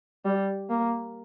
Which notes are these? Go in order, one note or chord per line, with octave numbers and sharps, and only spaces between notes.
G3
A#3